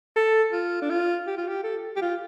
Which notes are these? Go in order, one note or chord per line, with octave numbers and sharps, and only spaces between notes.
A4
F4
D4
F4
G4
F4
G4
A4
G4
F4